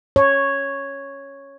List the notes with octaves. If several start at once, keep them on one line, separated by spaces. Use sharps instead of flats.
C#5